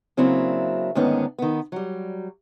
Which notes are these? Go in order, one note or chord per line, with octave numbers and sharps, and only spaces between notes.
C#3 F#3 A#3 C4 D4 E4
D2 G#2 D#3 B3 C#4 D4
D#3 B3
F#3 G3